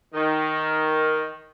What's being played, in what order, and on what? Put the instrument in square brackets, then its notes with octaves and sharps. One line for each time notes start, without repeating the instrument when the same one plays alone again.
[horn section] D#3